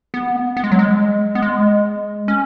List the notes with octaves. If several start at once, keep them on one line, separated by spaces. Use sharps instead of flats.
B3
B3
G#3
F#3
G#3
B3
G#3
C#4